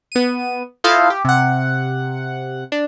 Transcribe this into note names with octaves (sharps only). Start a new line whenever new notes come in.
B3 D#7
E4 F4 A4 C5 D#5 F5
G4
C3 F#5
D4